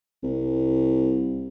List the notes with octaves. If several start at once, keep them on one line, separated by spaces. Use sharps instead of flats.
C2